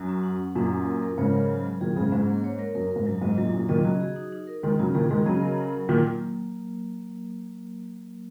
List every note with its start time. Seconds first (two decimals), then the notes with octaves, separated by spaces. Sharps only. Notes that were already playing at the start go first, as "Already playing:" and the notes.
Already playing: F#2 F#3 F#4
0.09 C#4
0.23 F#5
0.39 F#5
0.55 F#2 A#2 C#4
0.71 F#3
0.86 A#4
1.02 A#4
1.18 G#2 C#3 C#5
1.34 A#4
1.49 F#3
1.66 F#3
1.81 A#2 D#3 G#4
1.96 G#2 C#3 G#4
2.12 G#2 C#4
2.28 A#3
2.44 C#5
2.59 A#4
2.75 F#2 A#4
2.91 G#2 A#4
3.06 F#2 F#3
3.22 G#2 D#5
3.37 F#2 A#2 F#3
3.53 F#2 A#2 F#3
3.69 A#2 D#3 D#5
3.85 C#3 F#3 F#4
4.00 G#4
4.16 D#4
4.32 D#4
4.47 A#4
4.63 D#3 G#3 D#4
4.79 C#3 F#3 F#4
4.94 A#2 D#3 G#4
5.10 D#3 G#3 G#4
5.26 C#3 F#3 D#5
5.42 A#4
5.58 F#5
5.73 F#3
5.88 A#2 D#3 A#3